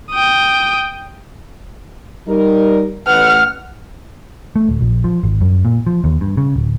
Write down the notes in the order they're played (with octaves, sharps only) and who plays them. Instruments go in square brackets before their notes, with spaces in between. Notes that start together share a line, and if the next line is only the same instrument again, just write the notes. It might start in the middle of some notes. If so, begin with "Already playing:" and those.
[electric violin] G5 D#6
[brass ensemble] G3 D#4 A#4
[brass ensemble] A1 B4 F#5 [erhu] F6
[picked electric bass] A3
D1
A#1
F3
G#1
F#2
A#2
F3
D#2
G2
C#3
D1